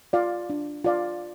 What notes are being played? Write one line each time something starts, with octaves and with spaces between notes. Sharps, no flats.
F4 D5 F5
D4
F4 D5 F5